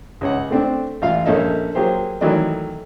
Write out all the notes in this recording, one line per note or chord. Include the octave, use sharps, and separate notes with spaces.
C#2 C#4 F#5
A3 C4 D4
A1 F4 F5
A#1 A#3 C#4 A4 D#5 E5
F#3 A#3 G4 G#4 C5
D#3 E3 F#3 A3 D5 D#5